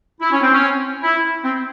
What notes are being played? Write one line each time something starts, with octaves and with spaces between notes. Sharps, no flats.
E4
C#4
C4
C#4
E4
C4